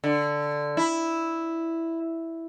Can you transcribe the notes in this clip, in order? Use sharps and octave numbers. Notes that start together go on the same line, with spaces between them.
D3
E4